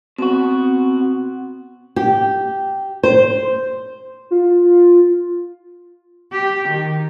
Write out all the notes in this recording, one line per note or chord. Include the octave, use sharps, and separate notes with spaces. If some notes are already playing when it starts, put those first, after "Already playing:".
B2 C4 F#4
G4
C5
F4
G4
D#3